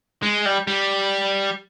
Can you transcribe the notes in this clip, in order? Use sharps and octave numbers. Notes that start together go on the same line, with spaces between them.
G#3
G3
G3